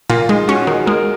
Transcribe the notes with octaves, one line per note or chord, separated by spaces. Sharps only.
A#2 F4
G#3 D#4
C#4 F#4
D#3 G#4
G#3 A#4